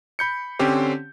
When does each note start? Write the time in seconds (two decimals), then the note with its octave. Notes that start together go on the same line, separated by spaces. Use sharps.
0.19 B5 G6 C#7
0.59 D3 C4 C#4 G4 C5